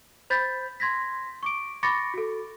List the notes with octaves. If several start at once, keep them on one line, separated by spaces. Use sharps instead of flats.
C5 B5 G6 A6 B6
C6 G#6 A#6 B6
C#6 D6 D7
B5 C#6 D6 A6 A#6 C#7
F#4 A4